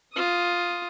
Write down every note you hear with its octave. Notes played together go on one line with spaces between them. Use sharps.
F4 D#6